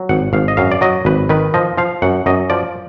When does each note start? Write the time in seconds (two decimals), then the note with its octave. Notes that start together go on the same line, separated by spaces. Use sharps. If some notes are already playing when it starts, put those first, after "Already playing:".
Already playing: F#3
0.09 G#1 F#5
0.33 G#1 F5
0.48 D#5
0.57 F#2 F5
0.72 D5
0.81 F#3 D#5
1.05 G#1 B4
1.29 D#3 B4
1.54 F3 D#5
1.78 F3 F5
2.02 F#2 F#5
2.26 F#2 D#5
2.50 F3 D5